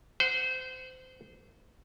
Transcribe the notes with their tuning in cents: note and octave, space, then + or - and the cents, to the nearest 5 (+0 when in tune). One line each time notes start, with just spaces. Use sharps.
C5 -25 F#5 +0